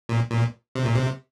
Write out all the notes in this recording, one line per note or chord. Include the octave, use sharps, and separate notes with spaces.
A#2
A#2
C3
A#2
C3